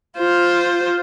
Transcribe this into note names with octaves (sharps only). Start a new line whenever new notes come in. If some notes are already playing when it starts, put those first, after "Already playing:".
F4 C5